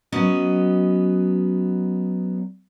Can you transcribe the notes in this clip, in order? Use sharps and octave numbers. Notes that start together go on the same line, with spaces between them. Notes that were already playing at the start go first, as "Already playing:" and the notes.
F#3 B3 C#4 D#5